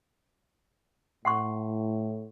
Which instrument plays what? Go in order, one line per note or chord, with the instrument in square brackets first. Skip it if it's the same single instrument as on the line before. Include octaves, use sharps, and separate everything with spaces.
[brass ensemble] A2 [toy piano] F#5 C6 C#6